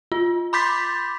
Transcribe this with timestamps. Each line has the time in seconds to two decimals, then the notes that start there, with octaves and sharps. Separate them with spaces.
0.12 F4
0.53 B5 C6 D6 G6 A6 B6